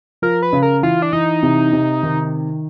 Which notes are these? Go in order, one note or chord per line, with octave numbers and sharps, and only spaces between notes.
F3 A#4
B4
C#3
A#4
E3 F4
D4
E3 D#4
C3
C3
D#3